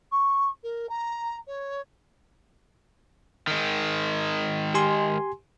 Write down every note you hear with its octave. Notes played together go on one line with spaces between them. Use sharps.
C#6
A#4
A#5
C#5
D#3 G#3
G4 G#5 C6